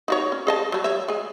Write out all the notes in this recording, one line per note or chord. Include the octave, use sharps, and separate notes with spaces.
D#4 F#4 C#5
C#4
G#4 D#5 A5
F#3 G3
C#5 E5
G#3 G#4